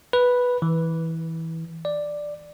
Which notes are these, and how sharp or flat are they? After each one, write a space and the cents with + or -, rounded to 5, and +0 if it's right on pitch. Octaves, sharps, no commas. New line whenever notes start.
B4 -5
E3 -20
D5 +5